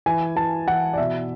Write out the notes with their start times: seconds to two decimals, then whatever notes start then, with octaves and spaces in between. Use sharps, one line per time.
0.06 E3 G#5
0.36 E3 A5
0.68 E3 F#5
0.93 D5
0.98 B2 E5